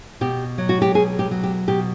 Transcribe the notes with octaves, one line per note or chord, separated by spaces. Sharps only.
B2 G4
F#3
F#4
G4
B2 G#4
G4
F#3
G4
B2 G4